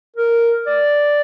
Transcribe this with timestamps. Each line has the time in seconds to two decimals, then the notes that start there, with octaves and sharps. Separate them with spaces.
0.16 A#4
0.67 D5